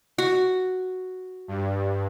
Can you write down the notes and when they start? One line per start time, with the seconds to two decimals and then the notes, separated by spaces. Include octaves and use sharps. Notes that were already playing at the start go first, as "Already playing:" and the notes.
0.18 F#4
1.48 G2